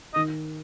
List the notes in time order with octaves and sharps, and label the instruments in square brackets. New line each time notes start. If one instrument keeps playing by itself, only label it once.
[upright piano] D#3 [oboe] D#5